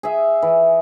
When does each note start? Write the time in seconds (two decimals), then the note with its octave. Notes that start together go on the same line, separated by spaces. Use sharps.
0.03 G#4 E5
0.42 E3